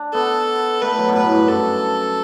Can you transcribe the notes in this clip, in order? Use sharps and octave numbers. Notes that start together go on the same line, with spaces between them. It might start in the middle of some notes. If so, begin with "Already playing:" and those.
Already playing: D4
B3 A4
A3 B4
F#3
B2
A2 B4
G2
F#2 A4